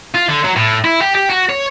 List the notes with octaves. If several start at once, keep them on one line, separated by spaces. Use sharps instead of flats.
F4
D3
F#3
A2
E4
G4
G4
F#4
C#5